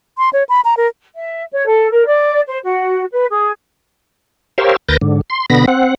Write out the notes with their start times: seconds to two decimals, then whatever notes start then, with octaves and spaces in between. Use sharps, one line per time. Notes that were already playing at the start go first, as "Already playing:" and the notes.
0.18 C6
0.33 C#5
0.49 B5
0.65 A#5
0.77 A#4
1.15 E5
1.52 C#5
1.68 A4
1.92 A#4
2.07 D5
2.50 C5
2.64 F#4
3.12 B4
3.31 G#4
4.58 G4 A#4 C5 C#5 F5 E6
4.89 D2 A#4 B4 G6 A6 A#6
5.01 G#2 D3
5.30 C6
5.50 B2 D3 B3 B5 A#6
5.68 C4 F#5